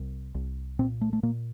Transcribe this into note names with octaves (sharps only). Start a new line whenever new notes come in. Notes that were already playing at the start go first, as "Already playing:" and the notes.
Already playing: C2
C2
A#2 C4
A3
A3
A#2 A#3